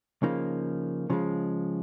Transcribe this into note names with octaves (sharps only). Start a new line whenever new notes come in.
C#3 F3 A#3 D#4
C#3 F3 G#3